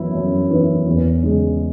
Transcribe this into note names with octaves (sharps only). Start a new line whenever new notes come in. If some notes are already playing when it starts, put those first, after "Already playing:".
Already playing: F#2 E3 B3 E4
F#2
E3 B3 E4
E2
C#3 G#3